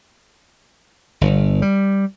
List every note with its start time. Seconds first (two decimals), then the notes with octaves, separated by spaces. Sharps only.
1.21 G1
1.62 G3